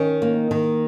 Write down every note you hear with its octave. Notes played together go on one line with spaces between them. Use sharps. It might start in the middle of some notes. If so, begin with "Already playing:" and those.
Already playing: D#3 C#4
A#3
D#3